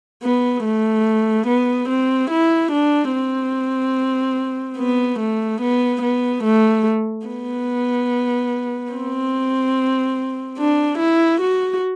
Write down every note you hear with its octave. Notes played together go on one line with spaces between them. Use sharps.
B3
A3
B3
C4
E4
D4
C4
B3
A3
B3
B3
A3
B3
C4
D4
E4
F#4